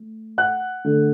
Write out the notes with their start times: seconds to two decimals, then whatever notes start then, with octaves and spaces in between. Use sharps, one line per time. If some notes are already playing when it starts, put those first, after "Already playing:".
Already playing: A3
0.38 F#5 F#6
0.85 D3 A3